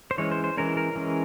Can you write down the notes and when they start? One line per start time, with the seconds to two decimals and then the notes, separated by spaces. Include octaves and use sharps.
0.11 C5
0.18 E3 G#3 C#4 C#5
0.31 C5
0.44 C5
0.57 E3 G#3 C#4 A#4
0.77 A#4
0.95 E3 G#3 C#4